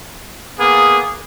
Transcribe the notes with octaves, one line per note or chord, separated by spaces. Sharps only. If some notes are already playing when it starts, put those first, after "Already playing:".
A#3 B3 G#4